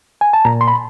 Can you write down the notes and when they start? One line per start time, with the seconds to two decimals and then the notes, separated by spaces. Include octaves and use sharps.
0.21 G#5
0.33 A5
0.45 A#2 A#5
0.61 C6
0.68 B5